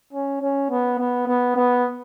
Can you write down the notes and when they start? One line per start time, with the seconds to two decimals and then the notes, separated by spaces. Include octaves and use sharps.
0.13 C#4
0.42 C#4
0.70 B3
0.99 B3
1.27 B3
1.56 B3